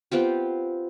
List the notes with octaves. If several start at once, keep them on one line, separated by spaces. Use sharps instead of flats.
B3 C4 F4 G4